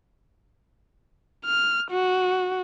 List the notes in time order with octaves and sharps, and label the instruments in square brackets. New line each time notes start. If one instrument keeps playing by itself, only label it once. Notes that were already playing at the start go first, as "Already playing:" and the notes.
[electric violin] F6
F#4